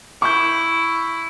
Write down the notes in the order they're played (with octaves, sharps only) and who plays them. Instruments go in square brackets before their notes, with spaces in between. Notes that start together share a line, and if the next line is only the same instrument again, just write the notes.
[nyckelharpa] E4 [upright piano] C#6 G6